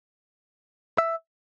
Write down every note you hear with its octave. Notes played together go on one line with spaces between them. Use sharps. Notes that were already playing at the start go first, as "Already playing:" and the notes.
E5